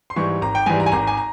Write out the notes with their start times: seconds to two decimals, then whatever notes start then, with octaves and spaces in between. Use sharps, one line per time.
0.10 C6
0.16 G#2 E3 G3 C#6
0.41 G#1 A#5
0.55 G5
0.66 G#2 E3 G3 G#5
0.80 A#5
0.86 G#5
0.92 G#1 A#5
1.07 G#5
1.17 A#5